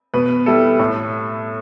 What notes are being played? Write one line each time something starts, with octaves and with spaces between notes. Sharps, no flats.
B2 B4
G3 E4 A4
A2